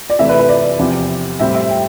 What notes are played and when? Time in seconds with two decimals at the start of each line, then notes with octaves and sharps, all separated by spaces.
0.10 D5
0.19 C3 E3 A3 E4 E5
0.29 B4
0.39 B4
0.49 D5
0.79 E2 C3 F3 C4 G4
1.40 A2 G3 C4 G4 E5
1.55 E5
1.69 G5